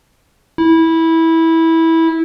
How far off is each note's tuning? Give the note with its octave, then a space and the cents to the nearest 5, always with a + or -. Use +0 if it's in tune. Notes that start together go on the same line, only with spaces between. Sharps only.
E4 -15